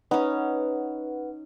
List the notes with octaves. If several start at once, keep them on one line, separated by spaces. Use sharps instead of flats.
C#4 D#4 B4 F#5